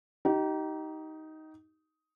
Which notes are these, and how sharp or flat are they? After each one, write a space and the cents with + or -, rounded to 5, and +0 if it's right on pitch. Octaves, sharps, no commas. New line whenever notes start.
D#4 +10 G4 -30